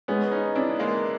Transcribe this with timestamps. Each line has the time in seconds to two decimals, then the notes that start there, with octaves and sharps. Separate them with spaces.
0.08 G#3 B3 C#4
0.32 C#4 D#4
0.55 C#4 D4 E4
0.79 G#3 A#3